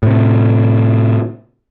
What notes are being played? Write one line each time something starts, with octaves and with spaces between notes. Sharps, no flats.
A2 C3